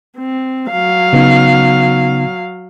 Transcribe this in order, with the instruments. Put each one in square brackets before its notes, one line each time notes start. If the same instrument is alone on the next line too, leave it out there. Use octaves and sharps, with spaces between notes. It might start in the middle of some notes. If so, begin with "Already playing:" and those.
[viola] C4
F#3 F5
[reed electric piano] C#3 B3 D#4